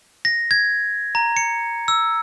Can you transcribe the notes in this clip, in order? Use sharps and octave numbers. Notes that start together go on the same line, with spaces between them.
A#6
G#6
A#5
C#7
E6